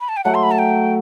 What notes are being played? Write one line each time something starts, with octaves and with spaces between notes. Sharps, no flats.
B5
A5
G5
F#3 A3 F#5
C6
B5
A5
G5